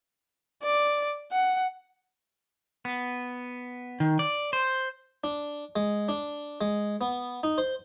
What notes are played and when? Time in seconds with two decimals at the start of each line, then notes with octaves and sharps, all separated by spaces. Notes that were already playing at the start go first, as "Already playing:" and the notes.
0.63 D5
1.32 F#5
2.85 B3
4.00 D#3
4.19 D5
4.53 C5
5.24 D4
5.76 G#3
6.09 D4
6.61 G#3
7.01 B3
7.43 D#4
7.58 C5